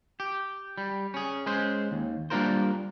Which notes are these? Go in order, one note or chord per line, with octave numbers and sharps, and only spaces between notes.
G4
G3
C#4 G#4
G#3 C#4 G#4 C5
D#2
G3 A#3 D4 F4 A#4 C5